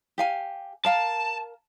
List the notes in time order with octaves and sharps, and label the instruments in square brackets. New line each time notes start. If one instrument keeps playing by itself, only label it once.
[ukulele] G4 F5 G#5
[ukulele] A#4 F5 A#5 [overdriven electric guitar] A5